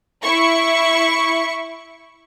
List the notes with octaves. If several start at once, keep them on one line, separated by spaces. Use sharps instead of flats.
E4 C#6